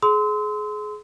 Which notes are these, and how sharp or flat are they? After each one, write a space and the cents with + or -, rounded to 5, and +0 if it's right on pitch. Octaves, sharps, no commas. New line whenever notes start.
G#4 +25 C6 -25 E6 -40